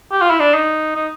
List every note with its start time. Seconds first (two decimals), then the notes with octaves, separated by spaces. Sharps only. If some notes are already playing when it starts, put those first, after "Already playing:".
0.12 G4
0.21 F4
0.30 E4
0.40 D4
0.55 D#4
0.96 D#4